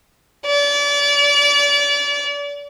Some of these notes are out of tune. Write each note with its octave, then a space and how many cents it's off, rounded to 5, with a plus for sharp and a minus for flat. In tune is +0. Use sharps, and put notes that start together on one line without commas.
D5 -35